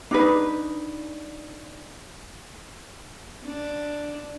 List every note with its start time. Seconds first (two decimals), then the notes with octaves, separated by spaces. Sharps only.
0.11 D4 D#4 B4
3.45 D4